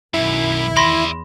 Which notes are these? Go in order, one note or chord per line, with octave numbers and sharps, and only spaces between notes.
B1 F#2 D#3 E4
E2 D5 E5 B5 C6 A#6